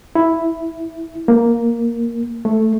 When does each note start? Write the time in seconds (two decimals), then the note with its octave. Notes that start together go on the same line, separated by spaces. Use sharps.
0.15 E4
1.28 A#3
2.45 A3